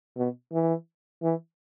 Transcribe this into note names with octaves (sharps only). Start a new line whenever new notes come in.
B2
E3
E3